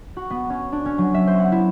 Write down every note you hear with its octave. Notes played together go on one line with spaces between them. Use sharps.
F#4
B3
C#4
D4
C#4
F#3
E5
C5
F#5
E4